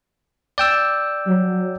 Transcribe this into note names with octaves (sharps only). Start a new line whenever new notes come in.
D5 G5 E6
F#3